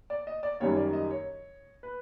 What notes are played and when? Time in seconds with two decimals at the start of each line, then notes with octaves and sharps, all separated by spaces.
0.10 D5
0.27 D#5
0.43 D5
0.60 F#2 D#3 G3 A#3 C#5
0.77 D5
0.93 D#5
1.11 C#5
1.83 B4